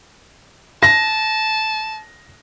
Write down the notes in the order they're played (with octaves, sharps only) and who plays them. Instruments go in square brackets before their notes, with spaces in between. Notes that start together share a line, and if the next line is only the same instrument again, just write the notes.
[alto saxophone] A5 [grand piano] A#6